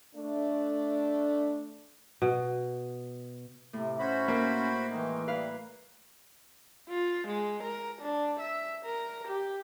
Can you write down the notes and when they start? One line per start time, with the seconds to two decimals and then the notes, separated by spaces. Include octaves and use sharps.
0.14 A3 D4
2.22 B2
3.73 A2 C3
3.99 C#4 F#4 C5 B5
4.28 A#3
4.89 D#3 E3 G#3 D#4
5.28 G3 B4 F5
6.89 F4
7.27 G#3
7.63 A#4
8.02 D4
8.40 E5
8.85 A#4
9.28 G4